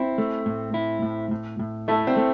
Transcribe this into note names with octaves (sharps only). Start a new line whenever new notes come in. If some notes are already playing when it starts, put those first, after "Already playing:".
Already playing: C4 E4
A3
A2
E4
A2
A2
A2
A3 E4
C4
A3